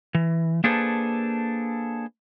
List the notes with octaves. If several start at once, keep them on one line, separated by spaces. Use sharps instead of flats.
E3
A#3 D4 G#4 A4 B4 C5